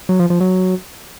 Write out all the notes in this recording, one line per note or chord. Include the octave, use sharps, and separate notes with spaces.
F#3
F3
F3
F#3